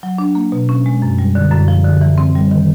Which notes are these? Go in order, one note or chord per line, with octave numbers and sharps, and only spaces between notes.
F#3
D4
A#3
B2
C#4
G#3
F#2
G3
D3
F#2
F3
D3
E3
C4
G3
D#3